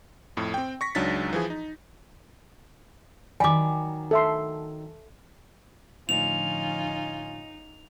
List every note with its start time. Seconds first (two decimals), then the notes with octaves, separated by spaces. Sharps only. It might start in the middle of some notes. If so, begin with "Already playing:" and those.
0.37 F2 A2
0.54 C4 G5
0.81 C#6 A#6 B6
0.95 C#2 F#3 D4 D#4 A6 B6
1.33 E3 F3 G#4
1.50 D#4
3.40 D#3 F#3 D5 G#5 B5 D6
4.11 A4 E5 C6
6.09 A2 D3 F3 C#4 D#4 F4 G#5 F7